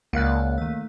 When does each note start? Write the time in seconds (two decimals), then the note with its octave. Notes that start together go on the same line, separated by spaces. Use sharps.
0.13 C#2 A#3 D5 F5 F#5 F#6
0.58 D#3 A3